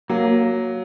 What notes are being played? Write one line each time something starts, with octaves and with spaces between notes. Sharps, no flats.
F#3 A#3